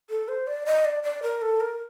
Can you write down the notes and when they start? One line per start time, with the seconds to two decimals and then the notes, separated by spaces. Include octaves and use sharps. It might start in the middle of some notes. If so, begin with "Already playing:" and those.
0.10 A4
0.28 C5
0.47 D5
0.66 D#5
0.85 D5
1.03 D5
1.23 A#4
1.41 A4
1.60 A#4